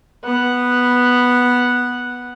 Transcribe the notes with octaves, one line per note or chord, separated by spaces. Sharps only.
B3 F#5